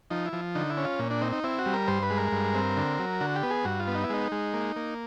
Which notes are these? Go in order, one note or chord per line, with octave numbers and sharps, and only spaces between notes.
F3 D#4
E4
F3
D3 D#4
E4
C#4
F4
A#2
D4
C4 D#4
D#4
C4 E4
F#4
G3
A#4
G2 C5
B4
G#3
A#4
G2
C4
D3
F#3
D3 F#4
G4
B3
G#4
G2 F#4
F4
B3
D#4
E4
G#3 D#4
G#3
A#3
A#3